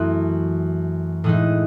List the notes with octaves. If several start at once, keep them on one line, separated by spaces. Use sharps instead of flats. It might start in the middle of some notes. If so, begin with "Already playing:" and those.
Already playing: F#2 E3 A3 C4 D#6 F#6
A2 E3 G#3 D#4 D#6 F#6